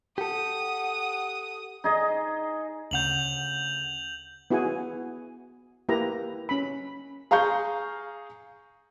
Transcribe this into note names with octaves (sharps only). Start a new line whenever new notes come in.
G4 A4 F#5 D#6
D#4 G#4 D#5
D2 C#3 F#5 G6 F7 F#7
B3 E4 F#4 G#4 F#5 G#5
A#3 E4 G4 B4 A#5
C#4 B5
G#4 F5 A#5 C#6 G6